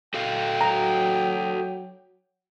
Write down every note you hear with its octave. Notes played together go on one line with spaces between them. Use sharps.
F#4 A4 F5 G5
F#3 A#5